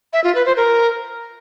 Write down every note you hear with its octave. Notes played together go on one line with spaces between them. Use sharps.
E5
F4
B4
C5
A#4